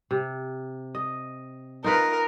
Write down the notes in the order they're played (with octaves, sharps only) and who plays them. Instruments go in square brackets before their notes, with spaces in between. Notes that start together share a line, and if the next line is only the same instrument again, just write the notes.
[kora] C3
D#5
[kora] D#4 F4 B4 [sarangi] A#4